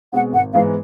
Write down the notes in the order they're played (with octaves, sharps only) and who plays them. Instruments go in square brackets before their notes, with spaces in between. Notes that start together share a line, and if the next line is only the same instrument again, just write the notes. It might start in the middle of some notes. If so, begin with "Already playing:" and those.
[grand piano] B2 G#3 C4 [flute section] F#5
[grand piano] G#1 [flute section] F#5
[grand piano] G#2 E3 G#3 B3 [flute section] F5